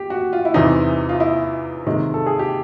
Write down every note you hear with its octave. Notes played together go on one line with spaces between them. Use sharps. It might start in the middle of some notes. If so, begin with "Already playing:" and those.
Already playing: G4
F#4
F4
E4
E2 C3 E3 D#4
F4
E4
C3 D#3 G#3
A4
G#4
G4